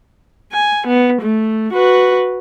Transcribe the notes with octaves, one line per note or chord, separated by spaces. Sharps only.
G#5
B3
A3
F#4 B4